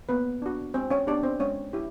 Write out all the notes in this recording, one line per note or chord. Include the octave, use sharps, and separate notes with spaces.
A#3 B3 B4
D4 F#4
G#3 C4 C5
C#4 C#5
B3 D4 D#4 G4 D5
C4 C5
G#3 C#4 C#5
E4 G4